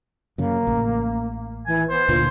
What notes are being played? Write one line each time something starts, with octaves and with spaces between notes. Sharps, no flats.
F#2 C#3 A#3
A1
E3 G#5
B3 C5
D2 A#2 D3 F4